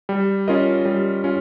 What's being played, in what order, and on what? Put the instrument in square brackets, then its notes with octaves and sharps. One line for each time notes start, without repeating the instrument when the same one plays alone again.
[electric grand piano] G3
C#4 F4 A#4 D#5
G3
C#4 F4